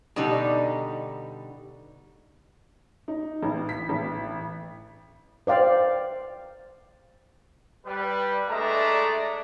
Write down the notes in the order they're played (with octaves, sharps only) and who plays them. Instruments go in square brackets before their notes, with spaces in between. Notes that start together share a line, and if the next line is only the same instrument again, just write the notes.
[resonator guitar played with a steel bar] B2 D3 G3 D#4
[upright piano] D#4
A1
B6
A1
[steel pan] C5 D5 F5 G5
[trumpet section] G3 B4
G#3 A3 D4 D5 E5 A#5